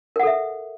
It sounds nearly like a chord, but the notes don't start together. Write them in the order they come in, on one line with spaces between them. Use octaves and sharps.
A#4 F#5 A4 E5